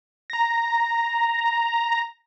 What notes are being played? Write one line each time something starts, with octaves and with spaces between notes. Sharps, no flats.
A#5 A#6